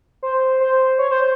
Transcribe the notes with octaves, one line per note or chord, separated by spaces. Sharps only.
C5
C5
C#5
C5